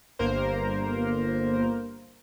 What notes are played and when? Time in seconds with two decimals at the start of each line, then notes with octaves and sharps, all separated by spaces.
0.19 G1 A#3 A#4 C5